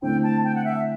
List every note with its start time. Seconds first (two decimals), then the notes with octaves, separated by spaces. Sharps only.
0.02 D3 A3 C4 E4 G5
0.23 A5
0.44 G5
0.55 F#5
0.65 E5